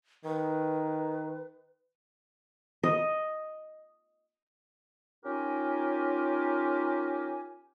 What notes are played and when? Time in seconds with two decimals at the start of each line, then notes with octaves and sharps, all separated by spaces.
0.25 D#3 B4
2.83 D#5
5.24 C#4 D#4 F4 G4 A#4 G#5